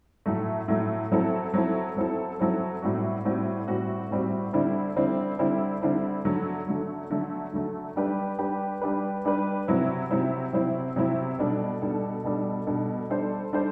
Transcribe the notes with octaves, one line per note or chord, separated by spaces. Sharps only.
A2 F#3 A3
A2 F#3 A3
F#3 C4 E4 A4
F#3 C4 E4 A4
F#3 C4 E4 A4
F#3 C4 E4 A4
A2 G3 C4 F#4
A2 G3 C4 F#4
A2 G3 C4 F#4
A2 G3 C4 F#4
D3 G3 C4 E4
D3 G3 C4 E4
D3 G3 C4 E4
D3 G3 C4 E4
D3 F#3 A3
D3 F#3 A3
D3 F#3 A3
D3 F#3 A3
G3 D4 G4 B4
G3 D4 G4 B4
G3 D4 G4 B4
G3 D4 G4 B4
C3 F#3 C4 E4
C3 F#3 C4 E4
C3 F#3 C4 E4
C3 F#3 C4 E4
B2 G3 D4 A4
B2 G3 D4 A4
B2 G3 D4 A4
B2 G3 D4 A4
G3 D4 A4 C5
G3 D4 A4 C5